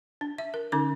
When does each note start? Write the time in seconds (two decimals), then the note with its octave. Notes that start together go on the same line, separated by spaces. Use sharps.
0.21 D4
0.38 E5
0.54 A#4
0.72 D3 C#4 D#4 D6